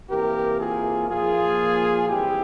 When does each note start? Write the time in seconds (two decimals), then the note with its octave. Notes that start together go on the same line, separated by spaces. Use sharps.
0.10 C3 E3 A#3 G4 A#4
0.60 F4 G#4
1.09 A#2 F3 A#3 F4 G#4
2.09 G#2 E3 G3 C4 E4 G4